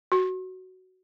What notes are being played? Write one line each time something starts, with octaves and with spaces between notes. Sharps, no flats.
F#4